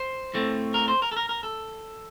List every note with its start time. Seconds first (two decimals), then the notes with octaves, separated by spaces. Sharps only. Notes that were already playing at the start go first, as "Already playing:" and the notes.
Already playing: C5
0.34 A2 A3 C4
0.74 A#4
0.88 C5
1.02 A#4
1.12 A4
1.17 A#4
1.29 A#4
1.43 A4